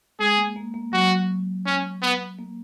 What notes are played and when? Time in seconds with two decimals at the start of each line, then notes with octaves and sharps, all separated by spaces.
0.19 G#3 G#4
0.38 A#3
0.56 A#3
0.74 A#3
0.92 F#3 F#4
1.66 C#4
2.02 B3
2.39 A#3